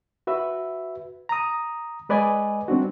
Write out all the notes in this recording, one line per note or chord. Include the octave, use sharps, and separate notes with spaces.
F#4 B4 E5
A#5 D#6
G#3 B4 D5 D#5 G#5
G3 C4 D4 F#4